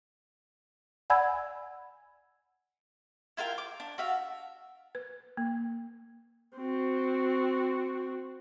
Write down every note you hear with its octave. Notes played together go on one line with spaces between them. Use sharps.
D5 F#5 G#5 B5 E6 G#6
E4 F4 A#4 G5
D6
D4
F#4 E5 F5
B4
A#3
C4 F#4